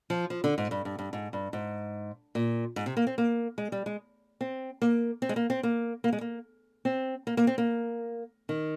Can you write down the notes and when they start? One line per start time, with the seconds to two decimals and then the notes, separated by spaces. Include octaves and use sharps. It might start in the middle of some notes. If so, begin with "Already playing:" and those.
0.10 F3
0.30 F3
0.44 D3
0.58 G#2
0.71 G2
0.85 G2
0.99 G2
1.13 G#2
1.33 G2
1.53 G#2
2.35 A#2
2.76 G#2
2.86 C3
2.97 A#3
3.07 C4
3.18 A#3
3.58 G#3
3.72 G3
3.86 G#3
4.41 C4
4.82 A#3
5.22 C4
5.29 G#3
5.36 A#3
5.50 C4
5.63 A#3
6.04 A#3
6.13 G#3
6.21 A#3
6.85 C4
7.27 A#3
7.37 A#3
7.47 C4
7.58 A#3
8.49 D#3